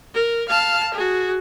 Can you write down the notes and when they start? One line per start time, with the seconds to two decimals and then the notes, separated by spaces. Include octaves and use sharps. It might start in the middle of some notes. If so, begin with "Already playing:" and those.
0.14 A#4
0.49 F5 A5
0.94 F#4 G#4